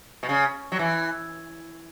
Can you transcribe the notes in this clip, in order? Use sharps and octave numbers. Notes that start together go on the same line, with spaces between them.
B2
C#3
F#3
E3